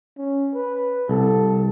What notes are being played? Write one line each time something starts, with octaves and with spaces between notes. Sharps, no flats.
C#4
B4
C2 A4